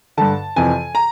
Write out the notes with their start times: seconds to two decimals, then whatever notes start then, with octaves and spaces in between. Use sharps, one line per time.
0.17 G2 D3 A5
0.56 F2 C3 E3 G#5
0.95 A#5